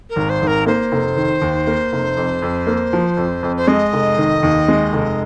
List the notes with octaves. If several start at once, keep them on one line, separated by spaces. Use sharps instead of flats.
A#4
G#1
C5
G#1
A#4
A#3 C5
F1
D#3
D#2
A#3
F1
F2
F2
A#3
F3
F2
F2
C5
G#3 D#5
F1
D#3
D#2
G#3
F1